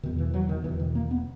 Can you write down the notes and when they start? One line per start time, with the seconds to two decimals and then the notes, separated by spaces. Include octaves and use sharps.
0.03 E2 B2 D#3
0.18 E3
0.34 F#3
0.49 D#3
0.64 E2 B2 E3
0.79 D#3
0.95 A#3
1.11 B3